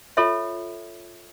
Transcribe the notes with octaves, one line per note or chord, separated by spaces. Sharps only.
F4 A4 C#5 E5